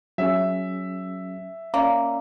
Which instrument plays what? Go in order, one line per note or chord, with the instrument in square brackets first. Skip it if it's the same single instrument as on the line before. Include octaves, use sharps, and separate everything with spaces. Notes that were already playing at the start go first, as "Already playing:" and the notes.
[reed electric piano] F#3 C#4 G#4 [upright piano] E5
[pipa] A#3 [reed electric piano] C#4 D5